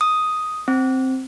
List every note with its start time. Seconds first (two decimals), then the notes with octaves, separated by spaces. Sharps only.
0.01 D#6
0.68 C4